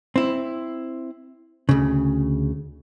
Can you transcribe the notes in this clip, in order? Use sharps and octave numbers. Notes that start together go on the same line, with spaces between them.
C4 E4
D2 C#3